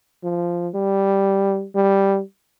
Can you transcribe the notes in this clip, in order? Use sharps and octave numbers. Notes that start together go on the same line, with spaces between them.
F3
G3
G3